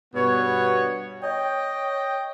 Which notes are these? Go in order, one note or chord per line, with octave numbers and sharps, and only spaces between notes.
G2 B2 B3 C#5
C#5 D#5 G5